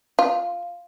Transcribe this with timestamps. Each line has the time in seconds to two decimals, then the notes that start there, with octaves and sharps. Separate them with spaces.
0.19 F4